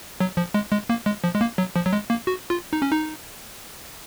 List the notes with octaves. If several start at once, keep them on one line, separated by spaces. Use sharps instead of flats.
F#3
F3
G#3
G#3
A#3
G#3
F3
G#3
A#3
F#3
F3
F#3
G#3
A#3
F#4
F4
D#4
C#4
D#4